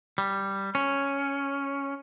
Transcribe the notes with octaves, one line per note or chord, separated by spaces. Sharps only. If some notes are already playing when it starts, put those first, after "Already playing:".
G3
C#4